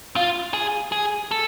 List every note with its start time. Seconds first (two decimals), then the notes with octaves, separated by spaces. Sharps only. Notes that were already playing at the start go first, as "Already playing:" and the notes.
0.16 F4
0.54 G#4
0.92 G#4
1.31 A4